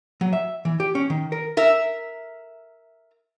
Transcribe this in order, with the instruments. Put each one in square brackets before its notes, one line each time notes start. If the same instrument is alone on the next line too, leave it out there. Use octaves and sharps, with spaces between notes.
[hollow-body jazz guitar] F#3
E5
E3
G4
C#4
D#3
A#4
[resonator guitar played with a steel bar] A#4 E5